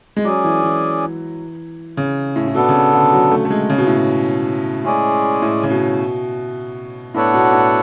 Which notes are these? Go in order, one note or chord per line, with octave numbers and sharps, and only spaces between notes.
G#3
F#3 C#4 G#4 D5
E3
E3
C#3
A2
A2
B2 B3 D4 A4
C#3
B2
D3
F#3
A3
A3
G#3
C#3
B2
A2
B2
A2 G#3 C#4 G#4 D5
A2
C#3
B2
A2 B3 D4 A4 C#5 F#5
B2
A2